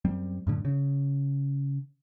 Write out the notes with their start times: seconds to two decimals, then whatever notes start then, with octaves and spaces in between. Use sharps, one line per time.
0.05 F#2 G3 C4
0.47 F#2 A2 D3
0.65 C#3